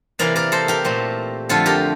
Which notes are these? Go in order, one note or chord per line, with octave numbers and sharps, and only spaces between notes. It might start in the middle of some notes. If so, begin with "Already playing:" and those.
C3 E3 A#3 A#4 D5
A#4 D5
A4 C5
G4 A#4
A#2 A3 C4
F2 D3 A3 F4 A4
G4 A#4